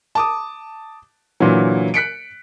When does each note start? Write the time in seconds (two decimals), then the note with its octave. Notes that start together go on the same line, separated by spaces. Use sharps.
0.15 A5 D6 D#6
1.40 A#2 D3 E3 F#3
1.94 F#6 B6 C#7 D7